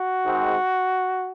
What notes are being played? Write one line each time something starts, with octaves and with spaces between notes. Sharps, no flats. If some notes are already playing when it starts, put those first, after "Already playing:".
Already playing: F#4
G#2 D#3 G#3 C4